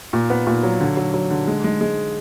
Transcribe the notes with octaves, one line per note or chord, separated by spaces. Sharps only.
A#2
B3
A#2
F#3
D3
F#3
F#3
D3
G#3
G#3
G#3